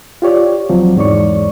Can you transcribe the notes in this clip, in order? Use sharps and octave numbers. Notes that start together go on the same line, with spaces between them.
F4 G4 C#5 D5
C#2 F3 F#3 C4
E2 G#2 C#5 D5 C#6